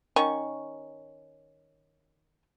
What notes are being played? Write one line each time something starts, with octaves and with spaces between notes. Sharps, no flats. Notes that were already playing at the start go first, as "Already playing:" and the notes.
D#3 C#4 C#6